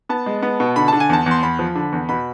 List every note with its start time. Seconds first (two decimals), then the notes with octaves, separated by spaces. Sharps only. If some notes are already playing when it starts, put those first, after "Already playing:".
0.09 B3 A5
0.26 G#3
0.43 B3
0.60 B2
0.76 D3 B5
0.88 D3 A5
1.00 G#5
1.09 E2 A5
1.26 E2
1.31 C6
1.43 E2 B5
1.59 F3
1.75 D3
1.92 E2
2.09 B2 B5